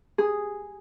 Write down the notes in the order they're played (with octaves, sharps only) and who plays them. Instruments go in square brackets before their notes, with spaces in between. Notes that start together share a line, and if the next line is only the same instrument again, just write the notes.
[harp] G#4